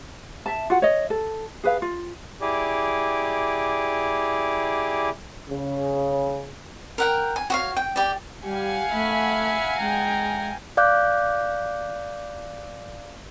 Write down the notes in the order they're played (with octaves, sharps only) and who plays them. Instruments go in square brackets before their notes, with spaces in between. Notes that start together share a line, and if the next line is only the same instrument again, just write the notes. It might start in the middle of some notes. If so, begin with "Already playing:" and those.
[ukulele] E5 A5
F4 F#4 F#5
C#5 D#5
A4
G#4 B4 F5
F4
[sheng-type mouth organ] E4 G4 G#4 D5
[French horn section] C#3
[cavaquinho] A#4 F#5 G5
G#5
F#4 C#5 F5
G5
G4 D5
[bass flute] G3 [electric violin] G4 [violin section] F5 F#5 G#5
[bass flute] A3 [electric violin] E5 B5
[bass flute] G#3 [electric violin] G5 A#5
[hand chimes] D5 F5 D6 F#6 G6